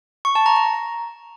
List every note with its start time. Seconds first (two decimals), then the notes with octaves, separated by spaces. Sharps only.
0.25 C#6
0.35 A5
0.46 A#5
0.56 A#5